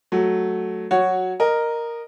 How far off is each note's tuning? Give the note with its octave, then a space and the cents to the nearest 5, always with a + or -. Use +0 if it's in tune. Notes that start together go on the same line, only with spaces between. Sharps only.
F#3 +0 A3 +0
F#3 -10 F#4 +0 C#5 +0
A#4 +0 D#5 -20